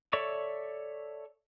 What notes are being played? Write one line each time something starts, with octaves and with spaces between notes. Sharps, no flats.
A4 C#5 D5 E5 C#6